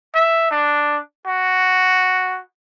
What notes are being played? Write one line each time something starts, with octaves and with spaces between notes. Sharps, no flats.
E5
D4
F#4